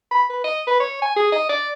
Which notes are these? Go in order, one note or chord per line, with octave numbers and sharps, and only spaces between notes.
B5
B4
D#5
B4
C#5
G#5
G#4
D#5
D5